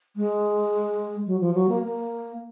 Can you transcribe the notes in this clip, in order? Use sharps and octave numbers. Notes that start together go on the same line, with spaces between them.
G#3
F#3
F3
F#3
A#3
A#3